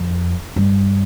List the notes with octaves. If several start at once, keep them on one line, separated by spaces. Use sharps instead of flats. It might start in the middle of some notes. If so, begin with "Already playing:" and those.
Already playing: F2
G2